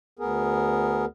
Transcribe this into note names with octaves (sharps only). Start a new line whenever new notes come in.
D2 B3 G#4 A#4